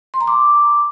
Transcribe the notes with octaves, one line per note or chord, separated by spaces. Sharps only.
C6
A#5
D6